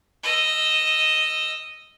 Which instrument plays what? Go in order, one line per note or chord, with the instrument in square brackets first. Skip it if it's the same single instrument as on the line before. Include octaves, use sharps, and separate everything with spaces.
[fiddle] D#5 E6